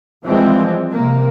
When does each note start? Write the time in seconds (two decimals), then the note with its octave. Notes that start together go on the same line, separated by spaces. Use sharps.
0.24 E3 F3 G3 G#3 C4
0.91 C3 A#3